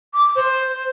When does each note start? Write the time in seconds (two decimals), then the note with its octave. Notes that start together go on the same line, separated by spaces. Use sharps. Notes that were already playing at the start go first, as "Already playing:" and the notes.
0.14 D6
0.35 C5